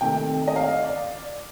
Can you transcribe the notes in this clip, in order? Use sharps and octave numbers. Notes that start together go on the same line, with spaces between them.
C3 D#3 A3 G5
D#5
F5
D5